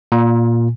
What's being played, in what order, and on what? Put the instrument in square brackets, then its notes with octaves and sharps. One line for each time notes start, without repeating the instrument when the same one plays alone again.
[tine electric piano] A#2